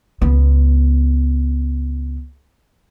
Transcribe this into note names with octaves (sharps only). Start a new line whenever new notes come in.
C#2 B3